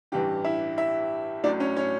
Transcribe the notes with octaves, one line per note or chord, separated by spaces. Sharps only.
A1 G2 E3 G3 G4
E4 E5
E4 E5
A1 A2 F#3 D4 D5
C#4 C#5
C#4 C#5